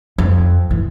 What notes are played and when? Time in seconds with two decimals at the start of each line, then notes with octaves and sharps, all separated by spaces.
0.18 F2
0.71 E3